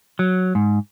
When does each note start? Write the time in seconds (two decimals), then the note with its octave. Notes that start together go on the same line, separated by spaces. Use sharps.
0.19 F#3
0.55 G#2